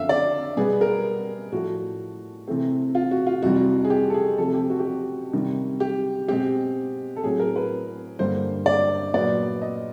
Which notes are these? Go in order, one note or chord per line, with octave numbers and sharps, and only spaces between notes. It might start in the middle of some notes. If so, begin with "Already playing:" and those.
Already playing: F#2 D3 F3 A3 C4 E5 F5
D5
B2 G3 B3 G#4
A#4
A2 F3 A3 F#4
C3 E3 A3 C4
F4
F#4
F4
F2 C3 E3 G3 F#4
G#4
G4
A4
G#4
C3 F3 A3 C4 A4
G4
F#4
G4
F#4
C3 D#3 G3
G4
B2 G#3 C4 G4
A4
A2 F#3 A3 C4 G#4
A#4
B4
G2 D3 G3 A#3 C5
D5
A#2 F#3 B3 D5
D#5